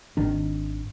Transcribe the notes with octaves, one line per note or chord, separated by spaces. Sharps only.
G#1 D#3 D4